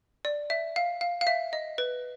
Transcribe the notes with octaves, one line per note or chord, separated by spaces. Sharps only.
D5
E5
F5
F5
F5
E5
D#5
B4